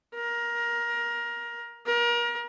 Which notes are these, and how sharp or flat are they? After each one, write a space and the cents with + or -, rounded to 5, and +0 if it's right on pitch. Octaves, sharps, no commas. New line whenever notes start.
A#4 +20
A#4 +30